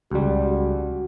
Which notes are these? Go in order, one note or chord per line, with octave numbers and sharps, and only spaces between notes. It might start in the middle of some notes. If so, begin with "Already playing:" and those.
C#2 G3 F#4